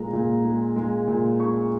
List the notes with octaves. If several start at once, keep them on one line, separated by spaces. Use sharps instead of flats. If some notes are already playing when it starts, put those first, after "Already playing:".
Already playing: A#2 G#3 A#5
A#2
G#3
G#3
A#2
G#3 C#6